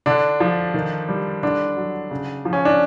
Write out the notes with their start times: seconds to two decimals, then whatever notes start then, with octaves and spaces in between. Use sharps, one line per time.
0.06 D3 D4
0.40 F3
0.74 D#3
1.09 G3
1.43 D3 D4
1.77 F#3
2.11 C#3
2.45 F3
2.53 C#4
2.65 D4